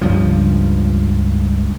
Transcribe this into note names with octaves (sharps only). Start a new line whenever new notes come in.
C#2 G2 F3